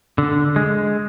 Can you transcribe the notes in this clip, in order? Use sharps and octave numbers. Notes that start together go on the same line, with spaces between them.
D3
G#3